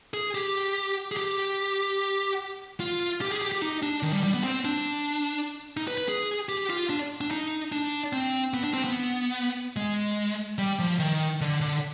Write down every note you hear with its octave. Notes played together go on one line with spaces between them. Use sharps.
G#4
G4
G#4
G4
F4
G4
G#4
G4
G4
D#4
D4
D#3
G3
G3
B3
C4
D4
D#4
B4
B4
G#4
G4
F4
D4
D4
D#4
D4
C4
B3
D4
C4
B3
G#3
G3
F3
D#3
D3
D3